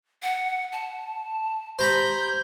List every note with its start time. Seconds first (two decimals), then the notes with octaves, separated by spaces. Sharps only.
0.22 F#5
0.72 A5
1.79 G4 C5 A#5 B5 G6